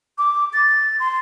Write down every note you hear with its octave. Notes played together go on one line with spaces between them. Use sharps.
D6
A6
C6